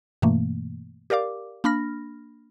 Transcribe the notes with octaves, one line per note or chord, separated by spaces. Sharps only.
G2 B2 E3 A3 A#3
G4 A#4 D5 F5 D6
A#3 D4 B5 F6 A#6